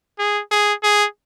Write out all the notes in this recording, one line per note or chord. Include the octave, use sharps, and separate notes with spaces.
G#4
G#4
G#4